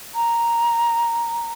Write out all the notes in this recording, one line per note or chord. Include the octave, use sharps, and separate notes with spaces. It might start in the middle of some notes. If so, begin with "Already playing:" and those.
A#5